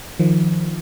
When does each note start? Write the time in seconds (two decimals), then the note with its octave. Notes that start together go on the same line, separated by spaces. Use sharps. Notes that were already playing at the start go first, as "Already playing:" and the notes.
0.19 D#3 F3